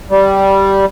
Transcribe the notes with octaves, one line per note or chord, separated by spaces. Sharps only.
G3